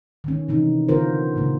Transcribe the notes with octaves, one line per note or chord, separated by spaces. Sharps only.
D#3 C#4
C3 E3 D#4
D3 B3 F4 A#4 C5
A#2 C#3 A#3